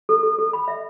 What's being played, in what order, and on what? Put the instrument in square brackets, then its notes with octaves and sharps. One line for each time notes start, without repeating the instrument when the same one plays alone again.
[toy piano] A4
A4
A4
B5
E5